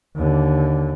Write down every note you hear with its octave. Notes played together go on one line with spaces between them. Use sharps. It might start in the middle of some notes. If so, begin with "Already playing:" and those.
D#2 D3